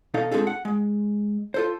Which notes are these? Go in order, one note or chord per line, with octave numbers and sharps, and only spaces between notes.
B2 D#4 A4 F5
G#3 C4 D4 F4 G#4 A4
F#5
G#3
F4 A4 C5